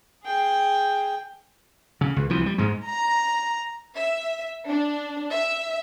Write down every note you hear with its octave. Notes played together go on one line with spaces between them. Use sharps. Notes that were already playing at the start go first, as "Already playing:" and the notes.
G#4 G5
C#3
C#2
C2 E3 F3
G3
G#2 G#3
A#5
E5
D4
E5